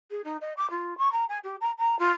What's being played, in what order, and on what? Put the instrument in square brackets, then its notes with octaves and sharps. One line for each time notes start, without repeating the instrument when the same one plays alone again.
[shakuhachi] G#4
D#4
D#5
D6
F4
C#6
A#5
G#5
G4
A#5
A#5
F4